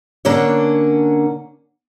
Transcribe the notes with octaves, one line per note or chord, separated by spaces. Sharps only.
D3 A#3 C#4 D4 C#5